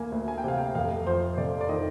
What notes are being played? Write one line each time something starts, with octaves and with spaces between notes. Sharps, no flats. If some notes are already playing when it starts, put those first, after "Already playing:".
Already playing: D2 A#3 G#5
D2
G#5
G5
C3 F5
G5
F1 F5
F2 C5
F1 D5
D5
D#3 D#5